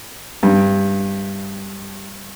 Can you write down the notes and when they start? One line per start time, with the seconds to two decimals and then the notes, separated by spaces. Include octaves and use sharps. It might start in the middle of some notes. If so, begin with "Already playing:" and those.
0.43 G2